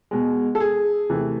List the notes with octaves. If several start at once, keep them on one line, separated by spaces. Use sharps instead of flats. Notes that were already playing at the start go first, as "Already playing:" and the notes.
B2 G#3
A4
G#4
C3 E3 A3